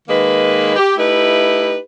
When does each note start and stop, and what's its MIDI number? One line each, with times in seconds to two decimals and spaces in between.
0.08 0.72 51
0.08 0.72 56
0.08 0.72 58
0.08 0.72 71
0.76 0.92 67
0.97 1.76 57
0.97 1.76 63
0.97 1.76 64
0.97 1.76 67
0.97 1.76 71